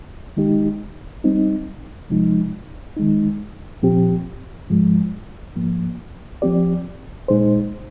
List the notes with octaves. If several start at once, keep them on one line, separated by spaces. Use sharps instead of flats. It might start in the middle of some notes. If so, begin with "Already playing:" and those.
D#3 G#3 D#4 G4
G3 C4 D#4
C3 F3 G#3 D#4
D#3 G#3 D#4
A#2 F3 C4 G4
G#2 F3 G#3
G#2 F3 A#3
F3 C4 G4 D5
A#2 G#3 D#4 G#4 C5